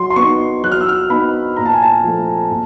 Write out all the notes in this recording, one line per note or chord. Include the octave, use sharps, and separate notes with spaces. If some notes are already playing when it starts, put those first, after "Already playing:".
Already playing: F#3 C6
C6
B3 C#6
D#4
F#3 F#6
F6
E6
F6
B3 D#4 B5
A#2 A#5
A5
G#5
A5
F3 A3
A#2